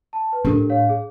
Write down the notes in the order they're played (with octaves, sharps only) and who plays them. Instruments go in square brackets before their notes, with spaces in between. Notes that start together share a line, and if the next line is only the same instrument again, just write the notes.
[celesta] A5
B4
[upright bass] A2 D4 [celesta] G4 A4 A#4
[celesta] C#5 F5
G#4